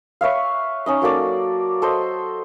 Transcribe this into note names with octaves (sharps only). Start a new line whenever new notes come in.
B4 C#5 E5 F5
C#4 D#4 D#5
F#3 A#3 A4 D5
A4 C5 D#5